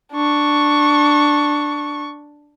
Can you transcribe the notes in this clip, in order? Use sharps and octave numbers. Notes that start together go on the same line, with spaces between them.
D4 C#6